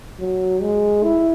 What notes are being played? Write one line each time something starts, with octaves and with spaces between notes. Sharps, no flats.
F#3
G#3
E4